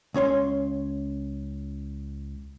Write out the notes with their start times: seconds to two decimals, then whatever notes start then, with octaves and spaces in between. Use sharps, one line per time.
0.14 C#2 C#4 C#5 C6